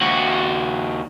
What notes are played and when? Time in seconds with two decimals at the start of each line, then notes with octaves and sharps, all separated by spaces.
0.01 D#2 F#4